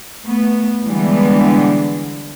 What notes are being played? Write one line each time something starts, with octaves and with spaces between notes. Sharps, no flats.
A3 B3
D3 E3 G3 G#3 B3 D4